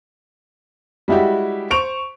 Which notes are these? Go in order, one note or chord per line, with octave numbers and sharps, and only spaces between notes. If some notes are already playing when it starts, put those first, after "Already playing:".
G3 G#3 E4 F#4 G4
C5 C#6 D7 F7